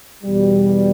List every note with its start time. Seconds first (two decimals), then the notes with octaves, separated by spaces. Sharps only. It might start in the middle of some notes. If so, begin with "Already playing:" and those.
0.24 E2 B2 G3